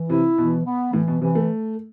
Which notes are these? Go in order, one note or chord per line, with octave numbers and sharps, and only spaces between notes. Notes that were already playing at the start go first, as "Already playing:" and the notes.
Already playing: E3
C3 E4
B2 E3
B3
A2 E3
B2
C3 E3
A3